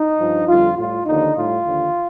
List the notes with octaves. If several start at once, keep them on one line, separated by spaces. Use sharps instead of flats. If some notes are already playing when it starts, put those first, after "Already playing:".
Already playing: D#4
G2 F3
F2 D3 G3 F4
A2 G3 F4
D#2 D3 F3 D#4
A2 G3 F4
D#2 D3 F3